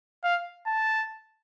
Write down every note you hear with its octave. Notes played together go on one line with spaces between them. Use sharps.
F5
A5